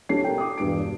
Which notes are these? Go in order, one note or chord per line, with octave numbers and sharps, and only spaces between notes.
B1 D4 G4 A4 C#5 C7
A#4 G5
D6 D#6
E1 G2 D7
D5